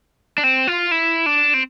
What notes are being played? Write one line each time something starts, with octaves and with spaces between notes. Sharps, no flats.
D4
C4
F4
E4
D4
C4